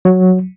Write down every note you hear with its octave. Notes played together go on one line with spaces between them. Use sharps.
F#3